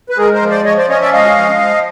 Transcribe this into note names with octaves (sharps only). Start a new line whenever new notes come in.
B4
G#3 G#4 A#4
A#4 C5
F3
C5 D5
F3 C#5 D#5
C5 D5
C#4 C#5 D#5
D5 E5
G#3 D#5 F5
F3
F3